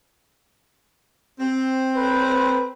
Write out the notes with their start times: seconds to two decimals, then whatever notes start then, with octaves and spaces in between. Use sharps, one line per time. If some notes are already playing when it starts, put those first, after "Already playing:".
1.40 C4
1.96 B4